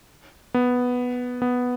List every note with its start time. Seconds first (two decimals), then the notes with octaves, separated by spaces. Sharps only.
0.54 B3
1.42 B3